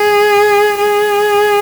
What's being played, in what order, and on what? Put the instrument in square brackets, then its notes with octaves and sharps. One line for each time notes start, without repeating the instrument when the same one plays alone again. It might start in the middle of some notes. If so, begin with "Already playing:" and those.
Already playing: [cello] G#4
G#4